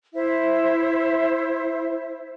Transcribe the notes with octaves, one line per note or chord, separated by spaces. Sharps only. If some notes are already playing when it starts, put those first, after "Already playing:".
E4 C5 E5